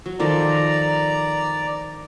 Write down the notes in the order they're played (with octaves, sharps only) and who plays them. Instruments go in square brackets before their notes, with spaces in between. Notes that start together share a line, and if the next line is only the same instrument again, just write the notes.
[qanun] F#3
[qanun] D#3 F3 A4 [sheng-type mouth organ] D5 A#5